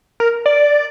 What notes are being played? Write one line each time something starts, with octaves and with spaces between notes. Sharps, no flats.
A#4
D5